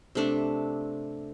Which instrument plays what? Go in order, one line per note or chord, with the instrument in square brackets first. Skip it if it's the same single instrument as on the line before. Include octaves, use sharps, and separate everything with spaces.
[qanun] C3 A3 D4